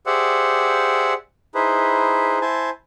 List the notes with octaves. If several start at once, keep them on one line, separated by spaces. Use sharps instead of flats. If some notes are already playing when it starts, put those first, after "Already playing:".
G4 G#4 C5 D5 E5 F#5
D#4 E4 G#4 B4 C5
E4 C5 G#5 A5